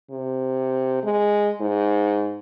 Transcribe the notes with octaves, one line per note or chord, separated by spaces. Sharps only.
C3
G#3
G#2